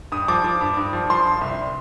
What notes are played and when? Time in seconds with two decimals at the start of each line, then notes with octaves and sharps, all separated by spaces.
0.12 G2 D#6
0.28 F3 D6
0.44 F3
0.61 G2
0.77 G2
0.93 F3
1.10 F3 C6
1.26 G2
1.41 C2